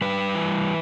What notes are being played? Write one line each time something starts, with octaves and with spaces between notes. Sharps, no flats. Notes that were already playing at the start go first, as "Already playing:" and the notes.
G3 B4
E3